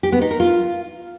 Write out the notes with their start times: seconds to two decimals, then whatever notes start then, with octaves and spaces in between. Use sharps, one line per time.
0.03 G4
0.12 B3
0.21 D#4
0.31 A#4
0.40 F4